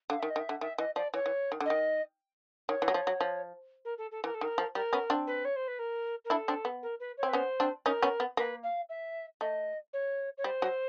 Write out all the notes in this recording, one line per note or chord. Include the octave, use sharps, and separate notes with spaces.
D3 F5
D#3 E5
D#5
D#3
E5
D3
D#3 E5
E3 D#5
F3 D5
E3 C#5
E3
D#3
D3
D#5
D#3
D#3 C#5
E3
F#3
F3
F#3
F3
A#4
A4
A4
E3 A#4
A4
D#3
A#4
F3
G3 A#4
B3 C#4
C4 D4
B4
C#5
C5
B4
A#4
A#4
D4 E4 A4
C4 D4
B3
A#4
B4
C#5
C4
B4
B3 C#4 C5
C4 D4
C#4 D#4 A#4
B3 C#4
B3
A#3 B4
F5
E5
A3 D#5
C#5
C#5
G3 C5
F#3